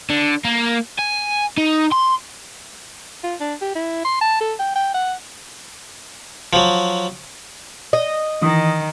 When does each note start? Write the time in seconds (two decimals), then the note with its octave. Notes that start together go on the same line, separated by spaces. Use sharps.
0.10 D3
0.45 A#3
0.99 G#5
1.58 D#4
1.92 C6
3.24 F4
3.40 D4
3.62 G4
3.76 E4
4.05 C6
4.21 A5
4.41 A4
4.59 G5
4.76 G5
4.94 F#5
6.53 F3 F#3
7.93 D#5
8.42 D#3 E3 D#6